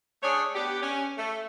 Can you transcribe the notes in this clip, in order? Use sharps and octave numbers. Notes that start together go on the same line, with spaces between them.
A3 D4 G#4 C#5
B3 D4 G4
C#4
A3